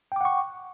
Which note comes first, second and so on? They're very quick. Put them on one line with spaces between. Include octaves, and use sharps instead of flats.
G5 D6 F#5 C#6